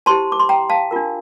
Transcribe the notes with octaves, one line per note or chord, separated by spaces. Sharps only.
E4 G4 C5 A5 C6
D6
C6
G5 A#5
F5 A5
D4 F4 A#4